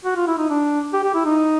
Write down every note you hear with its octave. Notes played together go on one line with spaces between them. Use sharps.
F#4
F4
E4
D#4
D4
G4
G4
E4
D#4